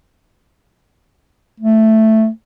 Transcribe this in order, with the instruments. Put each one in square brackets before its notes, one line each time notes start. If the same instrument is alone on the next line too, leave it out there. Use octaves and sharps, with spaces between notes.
[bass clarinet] A3